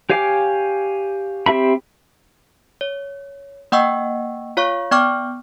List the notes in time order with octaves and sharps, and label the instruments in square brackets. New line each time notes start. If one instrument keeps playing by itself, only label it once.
[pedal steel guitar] G4 C#5 F5 G#5 D6
C4 G4 E5 B5
[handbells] C#5
A#3 D#5 F#5 G5 C#6 E6
F4 C#5 F5 C#6
B3 D5 G5 C#6 D6 F6